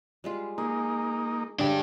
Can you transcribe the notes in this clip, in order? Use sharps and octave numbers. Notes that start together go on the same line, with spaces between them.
G3 G#3 F4
A#3 D#4 G#4
D3 G#3 C#4 D4 G4